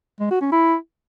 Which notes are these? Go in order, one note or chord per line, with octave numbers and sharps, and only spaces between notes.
G#3
F#4
C#4
E4